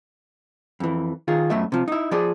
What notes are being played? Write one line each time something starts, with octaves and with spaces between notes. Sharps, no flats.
F2 E3
D#3 F4 G#4
F#2 A3 E5
C3 F3
D#4 E4
F3 G#4 D5